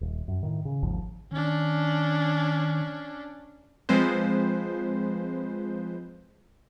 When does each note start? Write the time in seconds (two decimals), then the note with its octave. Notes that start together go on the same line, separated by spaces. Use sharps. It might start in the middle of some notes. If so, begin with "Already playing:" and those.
0.01 D#1
0.28 F#2
0.43 A2 D#3
0.65 C#3
0.83 G#1 D#2 G#2 F3
1.31 D#3 C#4 D4
3.89 F3 G#3 C4 B4 C5